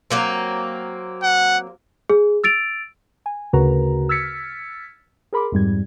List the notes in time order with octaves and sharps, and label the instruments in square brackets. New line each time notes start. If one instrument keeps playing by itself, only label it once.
[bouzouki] F#3 A#3 C4
[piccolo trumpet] F#5
[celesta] G#4
E6 A6 D7 F7
[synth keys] G#5
D2 C#3 F#4 A#4 B4 A#5
E6 F6 G#6 A6 B6 C#7
G#4 A#4 B5 C6 D6
F2 G#2 G3 G#6